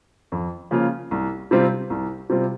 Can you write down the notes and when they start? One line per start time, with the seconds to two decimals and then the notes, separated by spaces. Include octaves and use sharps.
0.32 F2
0.71 C#3 F3 A#3 F4
1.11 C2
1.51 C3 G3 C4 F4
1.90 C2
2.29 C3 G3 C4 F4